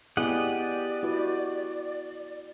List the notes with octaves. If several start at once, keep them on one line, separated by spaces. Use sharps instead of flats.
B3 E4 G4 G#4 D5 D#5 F#5
E4 F#4 B4